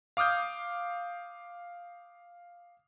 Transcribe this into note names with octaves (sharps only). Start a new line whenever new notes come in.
F5 D6 D#6 F6 G6